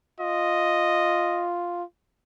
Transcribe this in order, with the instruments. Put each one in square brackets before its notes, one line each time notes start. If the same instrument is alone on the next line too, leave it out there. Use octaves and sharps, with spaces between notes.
[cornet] F4 [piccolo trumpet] D#5